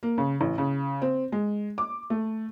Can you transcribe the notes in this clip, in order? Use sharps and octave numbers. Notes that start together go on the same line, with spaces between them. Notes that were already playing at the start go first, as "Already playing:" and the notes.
A#3
C#3
A1
C#3
C4
G#3
D6
A3